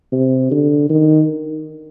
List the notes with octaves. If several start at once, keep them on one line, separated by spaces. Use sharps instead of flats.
C3
D3
D#3